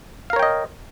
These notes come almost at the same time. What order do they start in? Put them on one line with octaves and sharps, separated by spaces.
F5 A#4 C#5 G5 D#5